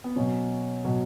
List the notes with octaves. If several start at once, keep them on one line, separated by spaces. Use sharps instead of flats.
B3
B2 F#3 C#4
B2 F#3